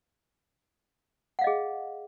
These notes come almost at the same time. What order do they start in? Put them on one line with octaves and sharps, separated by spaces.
F#5 F5 D#5 G#4